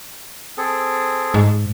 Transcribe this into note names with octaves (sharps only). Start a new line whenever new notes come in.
C4 G#4 A4
G#2